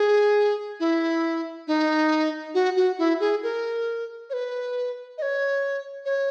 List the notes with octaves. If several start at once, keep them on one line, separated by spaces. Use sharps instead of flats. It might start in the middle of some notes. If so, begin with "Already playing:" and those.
Already playing: G#4
E4
D#4
F#4
F#4
E4
G#4
A#4
C#5
B4
D#5
C#5
C#5